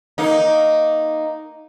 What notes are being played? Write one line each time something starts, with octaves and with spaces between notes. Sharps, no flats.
A#3 D#4